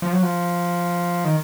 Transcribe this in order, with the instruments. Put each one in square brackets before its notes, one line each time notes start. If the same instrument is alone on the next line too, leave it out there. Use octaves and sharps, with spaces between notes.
[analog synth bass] F3
F#3
F3
D#3